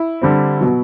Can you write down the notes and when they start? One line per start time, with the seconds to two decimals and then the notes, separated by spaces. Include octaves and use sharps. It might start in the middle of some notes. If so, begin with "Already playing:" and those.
Already playing: E4
0.22 D3 G3 C4
0.61 B2 F#3